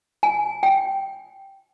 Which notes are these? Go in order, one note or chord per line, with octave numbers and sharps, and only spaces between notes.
G#5
G5